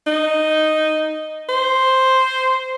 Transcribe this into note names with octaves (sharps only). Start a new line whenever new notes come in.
D#4
C5